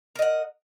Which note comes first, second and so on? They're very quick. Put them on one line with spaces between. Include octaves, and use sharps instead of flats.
A#4 D#5 F#5